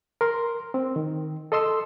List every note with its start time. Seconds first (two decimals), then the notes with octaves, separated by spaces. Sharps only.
0.21 A#4 C6
0.74 C4
0.96 D#3
1.52 A4 D#5 C6 E6